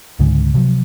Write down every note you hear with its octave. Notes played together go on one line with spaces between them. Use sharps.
C#2 G#2 D3 G#3
C3 F3 F#3